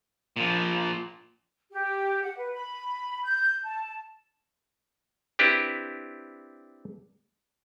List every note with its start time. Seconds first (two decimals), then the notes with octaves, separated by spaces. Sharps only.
0.37 A#2 F3
1.71 G4
2.23 F#5
2.37 B4
2.53 B5
3.24 G6
3.65 A5
5.39 C4 D4 E4 G4 B4